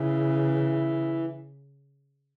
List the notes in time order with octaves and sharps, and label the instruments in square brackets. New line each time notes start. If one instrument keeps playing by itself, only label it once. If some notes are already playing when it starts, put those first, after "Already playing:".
Already playing: [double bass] C#3 [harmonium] E3